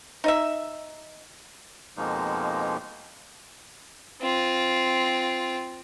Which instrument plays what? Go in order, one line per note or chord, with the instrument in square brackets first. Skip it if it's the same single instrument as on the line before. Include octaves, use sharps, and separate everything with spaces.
[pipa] D#4 D#5 E5
[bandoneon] F2 B2 F3 G#3 A#3 D#4
[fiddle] C4 F4